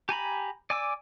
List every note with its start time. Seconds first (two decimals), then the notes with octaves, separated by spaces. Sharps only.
0.09 G4 G#5 A#5 B5
0.70 D5 G#5 D6 E6